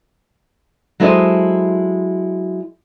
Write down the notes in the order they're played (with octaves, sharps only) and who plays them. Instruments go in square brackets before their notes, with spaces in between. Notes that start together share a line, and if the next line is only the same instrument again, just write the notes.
[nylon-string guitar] F#3 G#3 E4 A4 C5 D#5